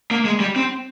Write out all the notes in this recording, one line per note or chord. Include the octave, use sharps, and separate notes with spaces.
A#3
G#3
G3
C4